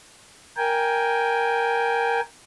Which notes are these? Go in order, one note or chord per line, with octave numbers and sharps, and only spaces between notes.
A#4 G5 G#5